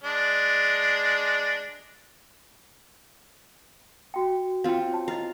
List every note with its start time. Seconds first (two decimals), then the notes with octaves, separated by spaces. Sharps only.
0.04 G#3 D4
4.14 F#4 G5
4.64 C4 F4 F5 G5
4.91 C#5 A5
5.08 E4 D#5 F5